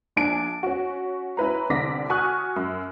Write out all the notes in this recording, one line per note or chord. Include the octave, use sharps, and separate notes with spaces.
A#1 D4 G#5 D7
C#4 F#4
C#4 E4 B4 A#5
C2 D3 D5 D6 A#6 B6
F#4 G#5 C#6 D#6 F6 F#6
F#2